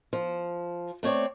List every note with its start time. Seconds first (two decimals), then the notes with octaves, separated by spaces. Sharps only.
0.13 F3
1.03 A3 C4 C#5 D5